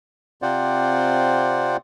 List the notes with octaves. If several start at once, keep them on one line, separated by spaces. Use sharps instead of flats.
C3 C4 F4 C5 D5 F#5